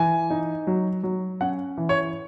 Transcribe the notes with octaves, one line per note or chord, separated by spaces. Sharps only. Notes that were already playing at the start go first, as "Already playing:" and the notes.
Already playing: E3 G#5
D#4
F#3
F#3
C#4 F#5
E3
C#5